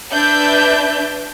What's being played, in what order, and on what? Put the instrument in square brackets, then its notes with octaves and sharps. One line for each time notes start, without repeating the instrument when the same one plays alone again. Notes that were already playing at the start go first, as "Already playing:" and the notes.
[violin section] D4 B4 E5 G6